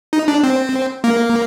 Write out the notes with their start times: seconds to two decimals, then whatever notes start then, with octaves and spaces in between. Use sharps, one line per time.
0.13 D#4
0.28 D4
0.43 C4
1.04 A#3